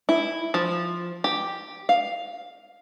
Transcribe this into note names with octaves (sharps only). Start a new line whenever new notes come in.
E4
F3
G4
F5